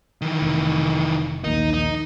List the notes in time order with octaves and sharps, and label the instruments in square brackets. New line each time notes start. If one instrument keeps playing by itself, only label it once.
[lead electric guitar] D#3 E3
[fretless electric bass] F1
[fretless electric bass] A#1 D#2 D#3 [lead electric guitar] D#4
[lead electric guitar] D#4